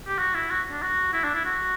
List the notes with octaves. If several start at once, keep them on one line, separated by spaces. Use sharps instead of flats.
G4
F#4
E4
F#4
D4
F#4
E4
D4
E4
F#4